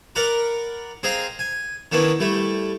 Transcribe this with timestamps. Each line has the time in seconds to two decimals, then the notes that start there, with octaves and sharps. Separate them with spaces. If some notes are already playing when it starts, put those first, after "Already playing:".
0.15 A#4 D5 F#5 A#5 B5
1.03 C4 G#4 D#5 F5 A#5
1.39 G#5
1.92 D#3 B3 C#4 D4 E4
2.20 G3 A3 E4